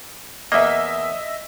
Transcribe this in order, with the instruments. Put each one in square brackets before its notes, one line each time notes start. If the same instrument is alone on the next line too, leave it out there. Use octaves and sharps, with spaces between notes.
[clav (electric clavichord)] E2 A#3 [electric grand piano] D#5 E5